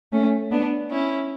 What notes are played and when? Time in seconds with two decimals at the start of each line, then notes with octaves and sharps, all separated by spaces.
0.12 A3 C#4
0.51 B3 D4
0.90 C#4 E4